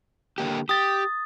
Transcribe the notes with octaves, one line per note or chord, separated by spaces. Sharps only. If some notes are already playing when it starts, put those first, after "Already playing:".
D3 A#3 G4
G4 D#6 A6